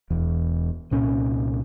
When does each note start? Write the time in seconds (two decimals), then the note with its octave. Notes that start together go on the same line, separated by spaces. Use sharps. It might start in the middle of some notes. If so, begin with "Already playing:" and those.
0.10 E1 E2
0.91 C2 A#2 C#4